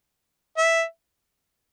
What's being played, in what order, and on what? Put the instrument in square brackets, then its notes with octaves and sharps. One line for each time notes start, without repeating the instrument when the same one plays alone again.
[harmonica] E5